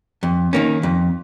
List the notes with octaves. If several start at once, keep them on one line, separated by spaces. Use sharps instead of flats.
F2
D#3 A#3 C#4
F2